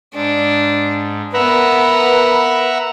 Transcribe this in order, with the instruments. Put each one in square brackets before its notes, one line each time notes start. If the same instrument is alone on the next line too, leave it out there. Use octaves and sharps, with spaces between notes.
[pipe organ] G#2 [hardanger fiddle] D4
[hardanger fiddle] B3 A#4 [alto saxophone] B4 [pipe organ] E5 F#5 A#5